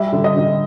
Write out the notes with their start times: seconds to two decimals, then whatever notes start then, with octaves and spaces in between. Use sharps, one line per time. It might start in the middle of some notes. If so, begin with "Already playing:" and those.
Already playing: G3 E5
0.12 D3
0.24 D#5
0.36 D3